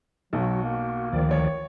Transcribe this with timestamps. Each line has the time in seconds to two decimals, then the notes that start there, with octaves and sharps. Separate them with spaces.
0.33 B1 F#3 F#4
0.64 A#3
1.13 D2 D#3 F3 D5
1.31 C#5